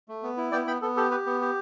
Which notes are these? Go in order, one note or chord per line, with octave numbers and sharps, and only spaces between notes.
A3
B3
E4
B3 D5 G5
B3 G5 B5
B3 A4
G4 A4
G4 B4
B3
G4